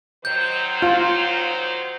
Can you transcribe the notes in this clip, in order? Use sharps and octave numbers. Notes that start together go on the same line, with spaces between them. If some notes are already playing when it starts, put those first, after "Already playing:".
D#3 F#3 C5 G6
F4